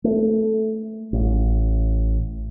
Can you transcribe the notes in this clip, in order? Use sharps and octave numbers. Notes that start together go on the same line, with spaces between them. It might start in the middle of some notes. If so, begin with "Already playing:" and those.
A3
A1